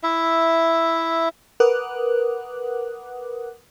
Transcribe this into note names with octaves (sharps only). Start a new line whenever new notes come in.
E4 E5
A#4 B4 F#5 D6 D#6 F#6